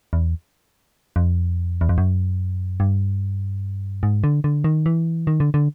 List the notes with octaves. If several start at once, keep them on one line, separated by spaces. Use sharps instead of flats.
E2
F2
E2
F2
F#2
G2
G#2
D3
D3
D#3
E3
D#3
D3
D3